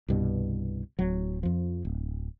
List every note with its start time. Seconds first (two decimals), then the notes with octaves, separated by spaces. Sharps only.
0.08 C2 G2 B2
0.99 D1 F#3
1.43 F2 F3
1.85 D1